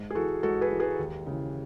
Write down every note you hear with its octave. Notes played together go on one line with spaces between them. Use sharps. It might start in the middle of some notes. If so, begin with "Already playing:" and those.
Already playing: G#2
G#4
E3 F#4 A4
G#2 F#4 A4
G#4 B4
E3
G#4 B4
D#2
C#3 E3